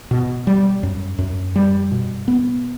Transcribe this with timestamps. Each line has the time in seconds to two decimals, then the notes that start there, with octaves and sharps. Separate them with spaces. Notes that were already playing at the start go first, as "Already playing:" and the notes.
0.11 B2
0.47 G3
0.83 F#2
1.19 F#2
1.56 G3
1.91 B2
2.28 B3